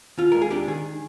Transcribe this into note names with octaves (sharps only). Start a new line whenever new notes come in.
D#2 F4
G#3 A#4
G#4
D4 G4
D#3 G#4